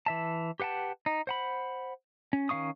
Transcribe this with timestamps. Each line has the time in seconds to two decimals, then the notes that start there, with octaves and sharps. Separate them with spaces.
0.06 E3 E5 A5
0.60 G4 B4 F#5 G5 A5
1.06 D#4
1.27 C5 F#5 B5
2.33 C#4
2.49 D#3 C#4 F5 C#6 D#6